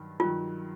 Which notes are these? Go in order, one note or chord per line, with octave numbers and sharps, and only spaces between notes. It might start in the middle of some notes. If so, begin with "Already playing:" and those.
Already playing: G2 D#3 F#3
G2 D#3 F#3 F4